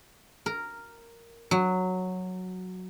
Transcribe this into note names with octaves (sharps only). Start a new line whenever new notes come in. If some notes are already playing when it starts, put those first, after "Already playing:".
A#4
F#3